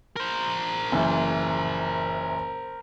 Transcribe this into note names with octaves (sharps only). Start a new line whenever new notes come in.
A#4 C5
F#1 E3